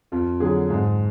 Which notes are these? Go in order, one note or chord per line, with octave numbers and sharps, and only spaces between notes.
F2 F4
D3 F#3 G#4
G#2